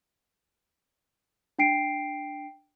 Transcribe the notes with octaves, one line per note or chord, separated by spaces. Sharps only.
D4 G5 C7 D7